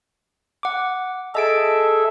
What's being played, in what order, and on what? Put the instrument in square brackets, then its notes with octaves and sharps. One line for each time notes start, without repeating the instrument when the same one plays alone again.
[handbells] F#5 D6
[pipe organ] G#4 A4 E5 [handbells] D#5 A5 D7